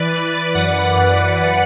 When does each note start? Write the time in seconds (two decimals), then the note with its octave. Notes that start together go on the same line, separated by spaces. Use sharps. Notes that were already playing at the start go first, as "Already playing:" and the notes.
Already playing: E3 B4 D5
0.15 E3 B4
0.34 D5
0.55 F#2 F#5
0.96 F#2
1.38 E3